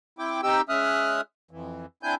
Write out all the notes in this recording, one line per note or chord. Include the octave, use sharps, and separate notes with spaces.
C4 E4 G5 D6
C4 D#4 G4 G5 E6
G#3 C#4 E5 D#6 F6 F#6
F2 E3
C4 D4 E4 G#5 G6